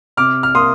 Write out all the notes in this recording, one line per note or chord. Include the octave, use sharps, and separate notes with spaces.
C3 D6 F6
F6
A#3 C6 D#6